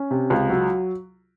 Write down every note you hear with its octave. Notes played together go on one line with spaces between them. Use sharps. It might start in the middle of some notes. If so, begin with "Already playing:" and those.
Already playing: C#4
C3
C#2
F#3